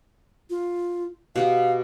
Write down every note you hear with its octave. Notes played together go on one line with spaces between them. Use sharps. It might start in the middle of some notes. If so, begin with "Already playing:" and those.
F4
B2 G4 F5 F#5